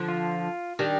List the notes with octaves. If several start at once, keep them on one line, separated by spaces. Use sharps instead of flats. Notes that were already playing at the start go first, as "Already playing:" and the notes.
Already playing: D3 F3
F4
D#3 G3 D4